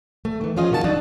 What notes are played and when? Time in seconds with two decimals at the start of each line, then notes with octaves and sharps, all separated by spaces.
0.25 A3
0.41 D#3 E3
0.56 F3 C#4 F4 G#4 D#5
0.71 C3 D#3 F#4 A#4 A5
0.84 F#3 D4 D#4